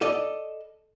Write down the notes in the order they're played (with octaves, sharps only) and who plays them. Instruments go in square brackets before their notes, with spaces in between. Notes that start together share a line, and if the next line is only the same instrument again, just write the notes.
[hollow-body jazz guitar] A4 D5 D#5